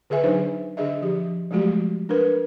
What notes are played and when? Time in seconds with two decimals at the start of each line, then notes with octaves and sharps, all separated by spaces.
0.10 D3 G#4 B4 E5 G#5
0.24 F#3 D4 D#4 G#4 C5
0.77 D3 D4 G#4 D#5 E5
1.02 F3 G4
1.51 F3 F#3 G#3 A3 F#4 G4
2.09 D4 A#4 B4